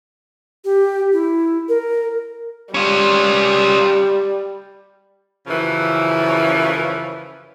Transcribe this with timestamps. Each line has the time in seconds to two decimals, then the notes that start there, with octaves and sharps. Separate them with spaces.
0.64 G4
1.12 E4
1.68 A#4
2.74 G3 C#4 F4
5.47 F#2 C#3 E3 F3